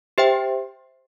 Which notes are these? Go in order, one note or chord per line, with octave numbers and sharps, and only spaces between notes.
G4 C5 E5 G5